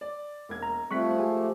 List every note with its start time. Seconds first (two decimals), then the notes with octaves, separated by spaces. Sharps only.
0.01 D5
0.49 E1 A#3 G#6
0.63 A#5
0.91 F3 G3 A3 C4 C#6 F#6 B6
1.19 G#3 G4 G#5